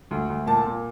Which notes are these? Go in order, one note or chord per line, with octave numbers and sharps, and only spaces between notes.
D2
D2
A#2 A5
A#2